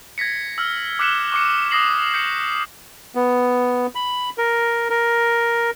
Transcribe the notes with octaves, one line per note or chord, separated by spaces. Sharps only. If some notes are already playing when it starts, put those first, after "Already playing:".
G#6 A#6 B6 C#7
E6 F6
D6 F6 F#6 B6 C#7 E7
C#6 D6 C#7
D6 D#6 A#6 C7 F#7
G6 C7 C#7
B3
B5
A#4
A#4